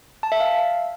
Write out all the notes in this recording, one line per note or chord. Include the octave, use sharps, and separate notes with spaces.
A5
E5
F5